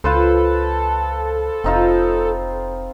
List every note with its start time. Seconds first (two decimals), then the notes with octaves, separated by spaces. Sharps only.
0.04 C#2 F4 A4 B4 C5
1.64 F1 C4 D#4 F4